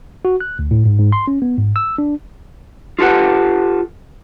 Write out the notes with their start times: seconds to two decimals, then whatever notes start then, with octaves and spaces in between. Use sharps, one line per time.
0.25 F#4
0.40 F#6
0.59 D2
0.71 A2
0.86 G#2
0.99 G#2
1.12 C6
1.28 C#4
1.42 B3
1.58 G#2
1.76 E6
1.98 D4
2.99 F4 G4 A4 B4 F#5